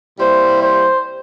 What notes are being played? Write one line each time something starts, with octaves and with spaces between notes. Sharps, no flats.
C3 G3 A#3 E4 C5
C5